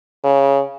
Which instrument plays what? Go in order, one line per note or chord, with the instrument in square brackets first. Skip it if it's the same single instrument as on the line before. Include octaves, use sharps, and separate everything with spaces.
[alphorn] C#3